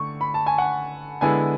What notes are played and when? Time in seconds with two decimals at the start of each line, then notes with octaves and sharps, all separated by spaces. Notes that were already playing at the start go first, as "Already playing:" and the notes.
Already playing: D3 A3 C#6
0.21 B5
0.34 A5
0.46 G#5
0.58 F#5
1.21 D3 G#3 B3 E4 G#5